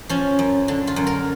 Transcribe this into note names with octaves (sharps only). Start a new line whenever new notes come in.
F3 C#4
F#2
D3
F4
F#2
A#4